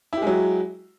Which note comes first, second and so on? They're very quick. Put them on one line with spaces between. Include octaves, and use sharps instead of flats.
E4 G4 G#3 F#3